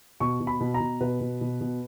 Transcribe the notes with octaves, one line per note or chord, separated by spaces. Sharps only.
B2 C#6
B2
B5
B2
A#5
B2
B2 B4
B2
B2
B2